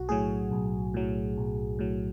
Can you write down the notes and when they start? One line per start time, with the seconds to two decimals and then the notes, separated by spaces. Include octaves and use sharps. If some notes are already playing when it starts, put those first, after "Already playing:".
Already playing: B1 F#4
0.09 A2 F#3 G#4
0.52 B1
0.94 A2 F#3
1.37 B1
1.79 A2 F#3